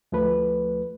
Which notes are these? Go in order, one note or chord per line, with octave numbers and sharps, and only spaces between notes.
D2 F3 A3 B4